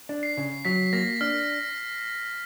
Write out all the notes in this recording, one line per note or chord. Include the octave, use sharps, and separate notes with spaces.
D4
C7
C#3
F#3 B6
A#3 A#6
D4 F6